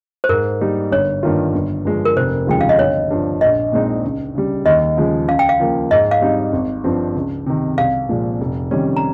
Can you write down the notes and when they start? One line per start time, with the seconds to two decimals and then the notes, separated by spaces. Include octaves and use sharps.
0.24 C5
0.29 G#2 A#4
0.61 G3 A#3 D#4
0.92 G1 C#5
1.23 G2 D#3 A#3 F4
1.54 G1
1.85 G2 F3 G#3
2.05 A#4
2.17 F1 C5
2.47 D#2 C#3 F3 G#3 G5
2.61 F5
2.69 D#5
2.79 G1 C#5
3.10 G2 F3
3.41 A#1 D#5
3.72 A#2 G#3 C4 D#4
4.03 C#2
4.35 C#3 G3
4.65 D#2 D#5
4.97 C#3 F3 G#3
5.28 C#2 F5
5.39 G5
5.49 F5
5.59 C#3 F3 A#3
5.91 G#2 D#5
6.11 F5
6.22 G3 C4 D#4
6.53 G#1
6.84 G2 F3 C4
7.15 C#2
7.46 C3 D#3
7.78 C2 F5
8.09 A#2 F3 G#3
8.41 F1
8.71 F2 D#3 G3 C#4
8.97 A#5